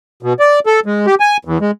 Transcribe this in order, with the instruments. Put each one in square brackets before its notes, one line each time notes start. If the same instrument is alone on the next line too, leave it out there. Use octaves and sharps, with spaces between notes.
[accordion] B2
D5
A4
G#3
G4
G#5
E2
G#3